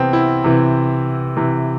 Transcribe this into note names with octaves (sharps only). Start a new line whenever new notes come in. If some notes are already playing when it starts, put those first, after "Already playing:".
Already playing: C3 E3 B3 C4
E4
C3 E3
C3 E3